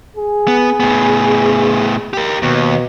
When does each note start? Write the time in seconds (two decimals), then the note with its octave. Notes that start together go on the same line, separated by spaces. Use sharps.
0.17 G#4
0.48 B3
0.80 A2 B3
2.14 G4 A#4
2.42 D#2 B2